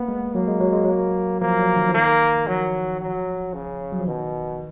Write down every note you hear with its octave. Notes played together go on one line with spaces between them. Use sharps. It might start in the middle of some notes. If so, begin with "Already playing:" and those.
Already playing: A#3 B3
G#3
F#3 A#3
G#3
F#3
G#3
F#3 A#3
F3 A#3
F#3
D#3
F3
D#3 A#3
F3 F#3
F#3
C#3
F#3
F3
B2 D#3